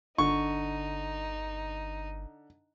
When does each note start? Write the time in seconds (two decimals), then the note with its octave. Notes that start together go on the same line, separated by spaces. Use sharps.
0.18 G1 D3 D#4 C#6